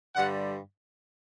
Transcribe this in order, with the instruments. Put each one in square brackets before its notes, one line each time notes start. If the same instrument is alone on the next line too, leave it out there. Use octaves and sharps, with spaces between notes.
[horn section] G2 D3 G3 F#5